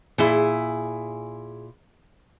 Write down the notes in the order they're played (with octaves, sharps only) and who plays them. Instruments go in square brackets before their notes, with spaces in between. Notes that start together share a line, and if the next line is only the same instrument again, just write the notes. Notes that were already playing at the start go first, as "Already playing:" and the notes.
[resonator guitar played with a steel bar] A#2 E4 [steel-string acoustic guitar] G#4 G#5